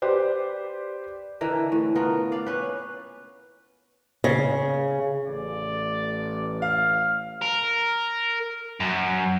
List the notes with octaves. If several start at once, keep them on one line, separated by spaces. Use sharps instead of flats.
G4 B4 C5 D5
D3 E3 A#4
A2
B3 F4 A#4
D5 F5
C#4 B4
C#3
A1 D5
F5 F6
A#4
F#2